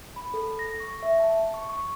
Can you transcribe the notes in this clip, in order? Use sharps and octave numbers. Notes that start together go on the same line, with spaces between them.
B5
A4
A#6
C#6
E5
A5
C#6
C#6